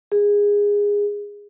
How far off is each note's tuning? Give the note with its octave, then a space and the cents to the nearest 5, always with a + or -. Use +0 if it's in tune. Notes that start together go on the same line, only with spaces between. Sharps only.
G#4 -20